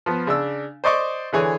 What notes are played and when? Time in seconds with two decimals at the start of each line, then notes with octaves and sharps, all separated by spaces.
0.06 F3 B3
0.27 C#3 D4 E6
0.84 C5 D5 D#5 C#6 D6
1.33 D3 E3 G#4 C#5